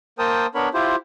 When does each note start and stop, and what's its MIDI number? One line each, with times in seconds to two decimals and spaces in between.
0.19 0.46 58
0.19 0.46 70
0.19 0.46 72
0.19 0.46 79
0.19 0.46 81
0.19 0.46 87
0.55 0.69 59
0.55 0.69 62
0.55 0.69 70
0.55 0.69 73
0.55 0.69 83
0.74 0.96 64
0.74 0.96 65
0.74 0.96 67
0.74 0.96 72